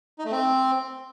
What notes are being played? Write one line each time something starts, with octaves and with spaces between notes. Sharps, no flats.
D#4
A3
C4